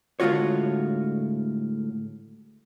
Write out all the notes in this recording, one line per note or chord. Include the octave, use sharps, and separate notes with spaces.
A2 D3 G#3 F4 F#4 C#5